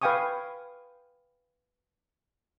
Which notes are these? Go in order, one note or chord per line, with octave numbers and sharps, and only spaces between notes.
B4 F5 G5 G#5 C#6 D#6